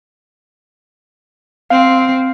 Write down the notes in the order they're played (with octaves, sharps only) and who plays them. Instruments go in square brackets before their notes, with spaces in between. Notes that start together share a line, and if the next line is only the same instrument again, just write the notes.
[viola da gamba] C4 [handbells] F5